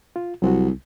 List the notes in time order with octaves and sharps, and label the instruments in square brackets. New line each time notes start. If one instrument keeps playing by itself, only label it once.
[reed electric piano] F4
[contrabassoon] C2 [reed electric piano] F#3 C4 F#4